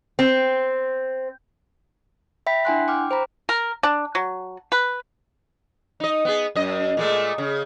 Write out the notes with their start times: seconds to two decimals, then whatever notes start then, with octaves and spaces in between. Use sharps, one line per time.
0.19 C4
2.47 E5 G5 B5 B6
2.65 D4 E4 F#5 G#5 C6 F#6
2.88 G5 D6 F6
3.11 C5 A#5 B5
3.49 A#4
3.83 D4
4.15 F#3
4.72 B4
6.00 D#4 D#5
6.25 B3 G#4
6.55 F#2 D#5
6.97 A#2 G#3 A3
7.38 C#3